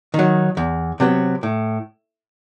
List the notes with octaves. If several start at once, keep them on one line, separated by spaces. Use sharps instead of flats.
D#3
F#3
E2
C3 F#3 B3
A2